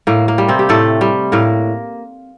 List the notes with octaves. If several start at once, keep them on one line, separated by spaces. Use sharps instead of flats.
A2 A#3
A#3
G3
C3 C4
G4
A2 A3 A4
G3
A2 A#3 A#4